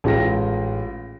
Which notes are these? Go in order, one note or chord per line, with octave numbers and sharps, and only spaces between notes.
A1 G#3 F4 G5 A#6